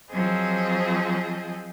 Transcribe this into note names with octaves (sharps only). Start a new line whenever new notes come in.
F3 F#3 C4 G#4 D#5